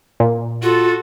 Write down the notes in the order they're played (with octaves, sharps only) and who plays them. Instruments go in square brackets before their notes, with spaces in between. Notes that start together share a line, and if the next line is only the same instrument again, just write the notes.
[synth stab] A#2
[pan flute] F4 [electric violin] F#4 A4